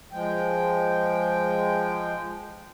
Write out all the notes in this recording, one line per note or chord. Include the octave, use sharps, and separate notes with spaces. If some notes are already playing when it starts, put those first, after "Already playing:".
F3 G#3 G5